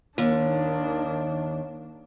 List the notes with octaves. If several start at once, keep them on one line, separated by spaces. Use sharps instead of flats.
D#2 D#3 D4